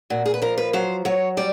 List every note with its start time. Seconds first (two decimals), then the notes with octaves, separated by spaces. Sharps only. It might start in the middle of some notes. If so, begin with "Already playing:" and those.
0.10 A#2 F#4
0.26 G#4
0.34 B4
0.42 F3 A#4
0.58 B4
0.73 F#3 C5
1.05 F#3 C#5
1.37 G3 D5